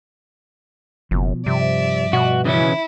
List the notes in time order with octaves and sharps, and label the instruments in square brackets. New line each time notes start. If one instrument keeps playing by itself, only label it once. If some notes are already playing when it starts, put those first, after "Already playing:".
[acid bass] F#1 [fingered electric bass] B2 F3
[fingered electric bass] G2 F3 [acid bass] C3 [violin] D5 E5
[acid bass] B2 [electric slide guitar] F#4
[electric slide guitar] C#3 E3 C#4 [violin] E4